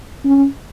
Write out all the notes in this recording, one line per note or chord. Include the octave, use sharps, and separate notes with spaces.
C#4